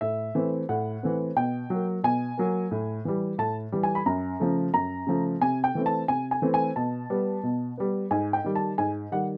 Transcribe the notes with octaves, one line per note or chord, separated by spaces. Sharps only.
A2 E5
E3 A3 C4
A2 F#5
E3 A3 C4
B2 G5
F#3 A#3
B2 G#5
F#3 A#3
A2
E3 G3
A2 A5
E3 G3
G#5
B5
F#2 A#5
C#3 F3 A3
F#2 A#5
C#3 F3 A3
C3 G#5
G5
E3 A3 C4
A5
C3 G#5
G#5
E3 A3 C4
G#5
B2 A5
G3 B3
B2
G3 B3
G#2 G#5
G5
D#3 G3
A5
G#2 G#5
D#3 G3 F#5